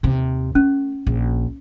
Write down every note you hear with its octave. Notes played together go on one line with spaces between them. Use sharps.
D#2 C3
A3 C#4
A#1